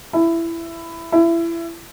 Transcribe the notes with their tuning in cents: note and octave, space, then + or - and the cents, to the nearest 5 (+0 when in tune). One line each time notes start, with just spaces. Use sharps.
E4 +15
E4 +25